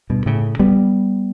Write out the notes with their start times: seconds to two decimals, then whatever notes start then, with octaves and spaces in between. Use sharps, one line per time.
0.10 G2 B2
0.26 A2 C#3
0.59 G3 B3